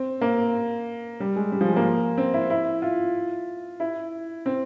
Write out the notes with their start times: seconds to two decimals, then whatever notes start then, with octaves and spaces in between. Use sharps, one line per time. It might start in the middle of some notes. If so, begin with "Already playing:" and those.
Already playing: C4
0.21 A#3
1.20 G3
1.36 G#3
1.52 G3
1.61 F3
1.68 G#3
1.76 A#3
2.18 C4
2.34 E4
2.50 E4
2.82 F4
3.80 E4
4.46 C4